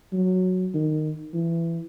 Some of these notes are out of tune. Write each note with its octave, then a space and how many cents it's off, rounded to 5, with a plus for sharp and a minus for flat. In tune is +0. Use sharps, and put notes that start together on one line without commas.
F#3 -5
D#3 -15
E3 +20